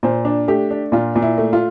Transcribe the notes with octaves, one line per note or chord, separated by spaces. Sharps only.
A#2 C5
D4
A3 G4
D4
A#2 F4
A#2
E4
A3
F4